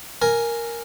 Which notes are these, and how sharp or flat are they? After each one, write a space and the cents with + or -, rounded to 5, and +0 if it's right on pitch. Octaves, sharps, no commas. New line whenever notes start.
A#4 +0 G#5 +0